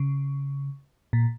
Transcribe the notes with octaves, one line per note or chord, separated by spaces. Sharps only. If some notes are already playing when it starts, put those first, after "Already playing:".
Already playing: C#3
A#2